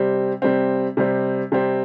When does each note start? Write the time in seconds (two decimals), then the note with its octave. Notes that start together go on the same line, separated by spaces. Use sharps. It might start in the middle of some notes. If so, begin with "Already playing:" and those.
Already playing: C3 G3 C4
0.42 C3 G3 C4
0.97 C3 G3 C4
1.52 C3 G3 C4